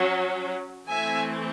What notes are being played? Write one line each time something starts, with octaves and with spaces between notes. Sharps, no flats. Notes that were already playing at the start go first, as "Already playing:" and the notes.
Already playing: F#3 C#4
E3 A3 C4 E5 G#5